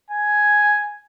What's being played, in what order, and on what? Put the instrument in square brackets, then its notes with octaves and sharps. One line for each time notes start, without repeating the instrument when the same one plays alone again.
[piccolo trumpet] G#5